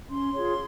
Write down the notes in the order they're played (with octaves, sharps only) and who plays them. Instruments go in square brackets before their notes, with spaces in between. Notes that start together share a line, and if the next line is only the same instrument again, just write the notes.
[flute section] C#4 C6
F4 G#4 C#5